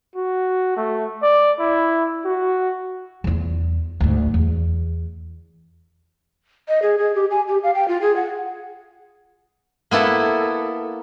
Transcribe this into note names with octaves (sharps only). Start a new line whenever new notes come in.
F#4
A3
D5
E4
F#4
E2 F4
D2 G#2
E2
D#5
G#4
G#4
G4
G#5
G4
F5
G5
F4
G#4
F#5
A#3 B3 E4 A4